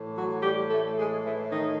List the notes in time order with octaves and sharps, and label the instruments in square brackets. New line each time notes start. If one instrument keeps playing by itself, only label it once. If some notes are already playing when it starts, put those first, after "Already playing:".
Already playing: [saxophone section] A2 E3
F#3 F#4
G3 G4
A3 A4
G#3 G#4
E3 E4
D#3 D#4